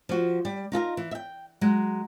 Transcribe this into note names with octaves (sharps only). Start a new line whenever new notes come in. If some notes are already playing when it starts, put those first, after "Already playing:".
F3 F#4
G3
D#4 F4 A4 A#4
E3
E5 G5
F#3 G#3